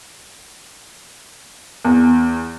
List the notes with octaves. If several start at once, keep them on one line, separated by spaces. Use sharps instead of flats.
E2